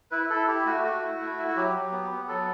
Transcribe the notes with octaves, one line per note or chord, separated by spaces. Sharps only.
E4 B4
B4
E4 A4
E4 G4
A3 F#4
G4
A3 F#4
E4
A3
E4
F#4
F#3 G4
F#3
B3
B3
F#3 A4